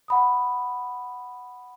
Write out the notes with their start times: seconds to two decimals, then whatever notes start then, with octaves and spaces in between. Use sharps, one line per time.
0.08 F#5 B5 D#6